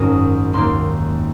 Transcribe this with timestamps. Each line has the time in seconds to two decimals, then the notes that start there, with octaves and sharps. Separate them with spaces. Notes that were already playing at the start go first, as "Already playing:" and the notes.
Already playing: G#1 F#2 D#3 G#3 C#4 D#6
0.53 D#2 D#3 A#3 C6